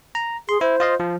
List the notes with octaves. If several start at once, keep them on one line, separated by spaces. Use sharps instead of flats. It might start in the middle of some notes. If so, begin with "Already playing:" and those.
A#5
G#4 C6
E4 C5
F4 D#5 F5
F3